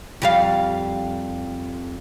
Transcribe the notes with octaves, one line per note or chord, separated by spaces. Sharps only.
F2 G3 F5